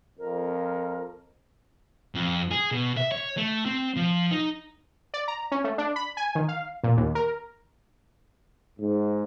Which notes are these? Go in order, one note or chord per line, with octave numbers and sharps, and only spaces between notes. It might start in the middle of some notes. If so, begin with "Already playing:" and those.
F2 A#4
F2
G#4
B2
E5
C#5
A3
C4
F3
D#4
D5
A#5
C#4
A3
D4
B5
G#5
D#3
F5
A#2
D#2
A#4
G#2